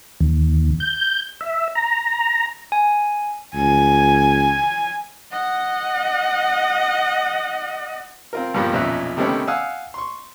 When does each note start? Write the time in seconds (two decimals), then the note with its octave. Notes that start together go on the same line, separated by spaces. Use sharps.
0.21 D#2
0.80 G6
1.41 E5
1.75 A#5
2.72 G#5
3.55 C#2 G#5
5.31 D#5 F#5
8.33 C4 F4 A#4
8.54 G2 A#2 F3 G3 A#3 B3
8.73 B1 F2 A#2 C#4 E5 F#6
9.17 C3 D#3 G3 A3 B3 C#4
9.47 F5 F#5 G#5 D#6 E6
9.94 C6 C#6